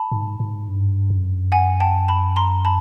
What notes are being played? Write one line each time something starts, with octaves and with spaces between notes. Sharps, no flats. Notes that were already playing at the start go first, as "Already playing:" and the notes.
Already playing: A5 B5
G#2
G#2
G2
F#2
F#5 G#5
G5 A5
A5 B5
A#5 C6
A5 B5